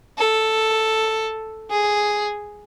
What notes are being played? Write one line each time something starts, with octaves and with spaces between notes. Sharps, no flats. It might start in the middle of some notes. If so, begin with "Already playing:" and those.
A4
G#4